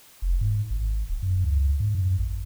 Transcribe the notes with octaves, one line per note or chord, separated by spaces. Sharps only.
F1
G#2
G#1
D1
F#2
C#2
G#2
F#2
A1